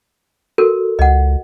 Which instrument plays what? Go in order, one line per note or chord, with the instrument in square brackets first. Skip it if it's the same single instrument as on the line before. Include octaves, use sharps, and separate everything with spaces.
[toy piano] F#4 A4 A#4
[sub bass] C#2 [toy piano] D#5 F#5